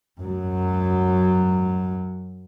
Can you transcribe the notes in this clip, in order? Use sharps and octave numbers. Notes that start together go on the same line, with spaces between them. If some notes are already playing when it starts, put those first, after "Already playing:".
F#2 F#3